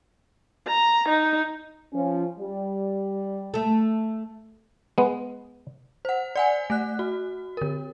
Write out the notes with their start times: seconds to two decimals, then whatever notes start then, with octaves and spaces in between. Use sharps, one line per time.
0.68 A#5
1.09 D#4
1.93 F3 C#4
2.38 G3
3.54 A3 A4
4.98 G#3 B3
6.05 C5 F#5
6.36 D5 F#5 G#5
6.70 A3 F#6
6.99 F#4
7.57 D3 A#4